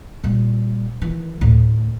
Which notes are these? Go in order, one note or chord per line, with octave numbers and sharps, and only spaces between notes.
A#2 G3
D#3 E3
D2 A2